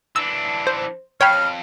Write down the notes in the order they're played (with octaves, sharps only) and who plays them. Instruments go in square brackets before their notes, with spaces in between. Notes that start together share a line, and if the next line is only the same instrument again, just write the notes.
[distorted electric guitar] E3 D4 [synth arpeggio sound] E6
[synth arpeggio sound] C5
[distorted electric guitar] F2 [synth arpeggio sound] C#5 G5 B5 [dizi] F6